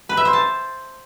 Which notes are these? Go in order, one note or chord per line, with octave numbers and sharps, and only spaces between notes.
B4
E5
C5
A5